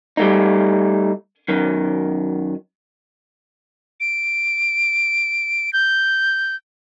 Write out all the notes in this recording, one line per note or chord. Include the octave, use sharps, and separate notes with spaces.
G3 A3 D#4
F#2 D#3
D7
G6